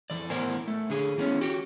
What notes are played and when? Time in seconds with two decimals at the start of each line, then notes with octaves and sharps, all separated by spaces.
0.10 F2 E3 D5
0.30 A2 B3 A#4 C5 G#5
0.68 A3
0.90 D3 G#4
1.18 E3 B3 C#4
1.41 F#4 G4